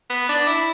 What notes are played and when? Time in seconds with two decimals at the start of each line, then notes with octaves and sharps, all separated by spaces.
0.10 B3
0.29 D4
0.47 E4